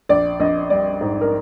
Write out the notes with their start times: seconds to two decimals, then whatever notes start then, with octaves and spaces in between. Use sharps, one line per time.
0.09 A#1 D5
0.40 A#1 D#5
0.70 G3 D5
1.01 G#2
1.21 A#4